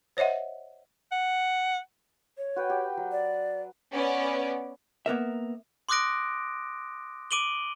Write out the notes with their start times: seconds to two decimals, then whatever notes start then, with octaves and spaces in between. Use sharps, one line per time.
0.17 C5 C#5 D#5 E5 F#5
1.12 F#5
2.38 C#5
2.56 F#4 B4 G5
2.70 G4
2.97 F#3
3.12 D5
3.91 B3 C#4 D5
5.06 A#3 B3 A#4 E5
5.89 C6 D6 D#6 F#6 A#6 D7
7.31 D6 D7 D#7 F#7 G7